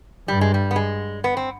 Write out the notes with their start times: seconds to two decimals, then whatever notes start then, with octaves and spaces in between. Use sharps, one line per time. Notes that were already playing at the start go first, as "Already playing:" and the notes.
0.28 G2 G3
0.41 G#3
0.54 G3
0.71 B3
0.76 G#3
1.24 B3
1.37 C4